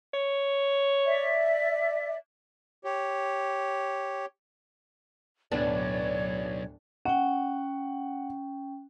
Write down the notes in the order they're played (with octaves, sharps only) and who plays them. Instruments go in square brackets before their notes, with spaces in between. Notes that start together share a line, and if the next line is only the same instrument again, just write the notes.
[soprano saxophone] C#5
[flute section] D5 E5
[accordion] G4 C#5
[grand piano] D1 B3 [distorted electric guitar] B1 [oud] D4 [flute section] C#5 D5
[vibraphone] C#4 G5 [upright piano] F#5